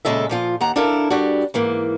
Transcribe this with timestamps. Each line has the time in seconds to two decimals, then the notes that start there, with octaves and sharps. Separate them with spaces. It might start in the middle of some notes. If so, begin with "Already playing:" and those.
0.05 A#2 C#3 G#3 A4 E5
0.29 A#2 F3 F4
0.61 D#2 F#5 A#5
0.76 D4 E4 A4 A#4 F5
1.10 G3 D4 F#4
1.54 G#2 E3 A#3